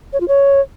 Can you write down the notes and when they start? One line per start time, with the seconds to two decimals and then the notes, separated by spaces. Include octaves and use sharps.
0.13 C#5
0.20 F4
0.28 C#5